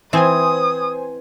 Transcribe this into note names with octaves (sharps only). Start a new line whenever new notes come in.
E3 C4 C5 G#5 D#6